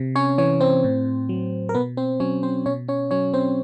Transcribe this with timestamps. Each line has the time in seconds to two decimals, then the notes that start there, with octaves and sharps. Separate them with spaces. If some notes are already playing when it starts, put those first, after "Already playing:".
Already playing: C3
0.16 C#4 C#5
0.38 E3 C#4 C#5
0.60 C4 C5
0.84 A2
1.29 F#3
1.69 A#4
1.75 B2 B3 B4
1.97 C4 C5
2.20 F#3 C#4 C#5
2.43 C4 C5
2.66 B2 C#4 C#5
2.88 C#4 C#5
3.11 F#3 C#4 C#5
3.34 C4 C5